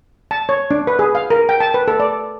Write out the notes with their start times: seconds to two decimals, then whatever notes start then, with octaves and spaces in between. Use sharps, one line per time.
0.31 A5
0.49 C#5
0.71 D4
0.87 B4
0.99 G#4
1.15 F5
1.30 A#4
1.49 G5
1.60 A5
1.74 B4
1.88 A4
2.00 D5